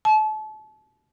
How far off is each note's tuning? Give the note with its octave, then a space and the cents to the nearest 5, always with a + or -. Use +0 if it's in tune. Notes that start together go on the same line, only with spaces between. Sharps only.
A5 -35